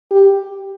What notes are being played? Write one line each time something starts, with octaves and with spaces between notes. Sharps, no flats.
G4